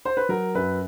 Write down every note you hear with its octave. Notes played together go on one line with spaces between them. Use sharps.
C5
B4
F#3 A#4
F#2 B4